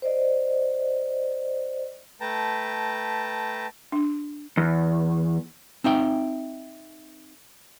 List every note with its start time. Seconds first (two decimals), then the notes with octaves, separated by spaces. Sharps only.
0.02 C5 D5 D#5
2.21 A3 B4 G5 A5 A#5
3.92 D4
4.57 E2
5.84 C4 D#4 E5 G5